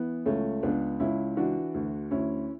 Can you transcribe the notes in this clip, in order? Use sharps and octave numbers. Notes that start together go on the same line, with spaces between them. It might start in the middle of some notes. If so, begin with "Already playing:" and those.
Already playing: E3 B3
C#2 A3 C#4
C#2 B3 D4
C#2 C#4 E4
E3 D4 F#4
D2
D2 C#4 E4